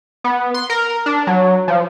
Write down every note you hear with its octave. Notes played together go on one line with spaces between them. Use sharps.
B3
C6
A#4
D4
F#3
F3